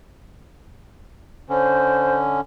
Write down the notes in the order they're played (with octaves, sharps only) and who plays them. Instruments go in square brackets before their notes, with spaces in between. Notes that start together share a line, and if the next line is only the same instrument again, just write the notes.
[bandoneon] D3 C#4 [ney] C5